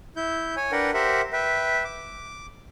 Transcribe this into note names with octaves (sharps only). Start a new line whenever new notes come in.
E4 G6
C#5 G#5
D4 A#4 B4 F#5 G5
G4 A#4 C5 E5 F#5
B4 E5 G5
D6